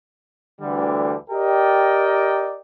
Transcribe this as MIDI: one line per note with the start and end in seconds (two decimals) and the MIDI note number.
0.61 1.15 38
0.61 1.15 50
0.61 1.15 52
0.61 1.15 55
1.30 2.58 67
1.30 2.58 70
1.30 2.58 74
1.30 2.58 75
1.30 2.58 79